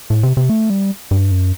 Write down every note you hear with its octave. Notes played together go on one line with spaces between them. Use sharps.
A2
C3
C3
A3
G3
G2
F#2